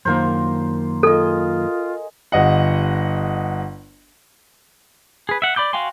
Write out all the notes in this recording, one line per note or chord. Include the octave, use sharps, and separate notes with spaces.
F#2 D#3 A#3 F4 A#4 C5
F4 G#4 A4 D#5
G1 D#5 F#5
G#4 B4
E5 F#5
D5 B5 D6 G6
F#4 F5 G5 G#5 C6